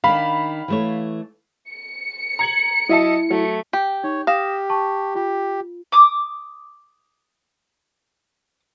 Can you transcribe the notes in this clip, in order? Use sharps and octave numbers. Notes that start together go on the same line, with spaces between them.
D#3 D4 F5 B5
E3 A3 C#5
C#7
A#5 G#6 F#7
F#3 E4 D#5 E5 A5
F#3 A3
G4 G5
D#4 C#5
G4 F5 D#6 A#6 E7
A5 C#6
F4 G4
D6 D#6